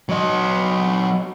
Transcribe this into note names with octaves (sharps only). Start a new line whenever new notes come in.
F#3 D#5